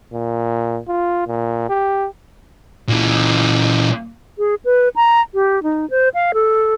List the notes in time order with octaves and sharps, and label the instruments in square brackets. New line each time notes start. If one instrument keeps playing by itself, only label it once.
[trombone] A#2
F4
A#2
G4
[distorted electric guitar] A#2 E3
[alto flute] G#4
B4
A#5
G4
D#4
C5
F5
A4